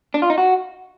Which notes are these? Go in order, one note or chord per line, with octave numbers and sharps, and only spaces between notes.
D4
F4
D#4
F#4